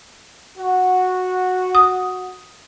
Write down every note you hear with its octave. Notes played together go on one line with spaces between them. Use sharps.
F#4
D#6